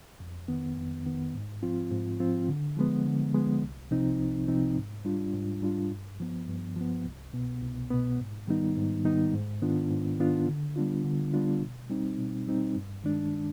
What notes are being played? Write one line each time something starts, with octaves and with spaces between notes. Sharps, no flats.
F2
D#3 B3
F2
D#3 B3
G#2
F3 C4 F4
G#2
F3 C4 F4
D3
F3 G#3 B3
D3
F3 G#3 B3
C2
C3 F3 C4 D#4
C2
C3 F3 C4 D#4
G#2
G3 D4 F4
G#2
G3 D4 F4
G2
F3 B3
G2
F3 B3
C2
B2 B3
C2
B2 B3
G#2
D#3 G3 B3 D#4
G#2
D#3 G3 B3 D#4
G#2
D#3 B3 D4 F4
G#2
D#3 B3 D4 F4
D3
G3 B3 D4 F4
D3
G3 B3 D4 F4
B2
G3 C4 D#4
B2
G3 C4 D#4
G2
D#3 G#3 D4